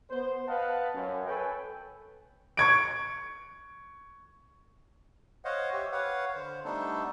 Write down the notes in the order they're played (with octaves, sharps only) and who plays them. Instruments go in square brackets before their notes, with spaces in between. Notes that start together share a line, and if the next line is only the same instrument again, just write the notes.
[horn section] B3 C5
B4 D#5 F5 F#5 A5
F#2
A4 B4 C#5 G5 G#5
[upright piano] C#6 G#6 D7
[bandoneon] C5 C#5 D#5 F5 F#5
G4 C#5 E5 G5
B4 C#5 F5 F#5
D3 C5
G3 A3 B3 D4 D#4 A4